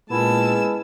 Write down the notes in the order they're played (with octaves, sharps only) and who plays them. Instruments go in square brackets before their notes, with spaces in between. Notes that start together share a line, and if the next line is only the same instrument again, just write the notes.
[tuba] A#2 [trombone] G#3 [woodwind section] B3 C#4 E4 [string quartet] A5 E6